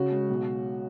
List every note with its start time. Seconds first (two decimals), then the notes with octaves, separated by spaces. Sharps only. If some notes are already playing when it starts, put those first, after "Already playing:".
Already playing: C#3 C#4 F#4
0.11 G#3
0.30 B1